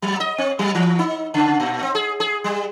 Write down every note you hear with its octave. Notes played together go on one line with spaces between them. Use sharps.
F#3
D#5
C4
F#3
E3
D#4
C#3
A#2
C4
G#4
G#4
G3